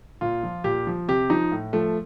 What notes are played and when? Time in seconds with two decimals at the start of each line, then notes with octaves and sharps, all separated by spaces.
0.21 A#2 F4
0.43 F3
0.64 A#2 G4
0.87 F3
1.08 C3 G4
1.30 F3 D#4
1.52 A2
1.73 F3 A3